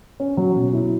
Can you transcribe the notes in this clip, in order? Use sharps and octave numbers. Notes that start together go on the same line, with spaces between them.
C#4
F#3
B2
E4